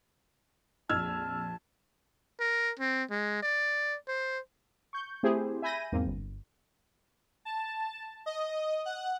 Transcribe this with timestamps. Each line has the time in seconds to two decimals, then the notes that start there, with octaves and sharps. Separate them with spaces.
0.89 A#1 F2 A5 E6 F6 G#6
2.40 A#4
2.80 C4
3.10 G#3
3.43 D5
4.08 C5
4.93 C#6 G6
5.23 A3 C4 E4 G4 G#4 C5
5.62 E5 G#5 B5 G6 A#6 D#7
5.92 E2 G#2 A#3 C4
6.06 G1
7.45 A5
8.26 D#5
8.85 F#5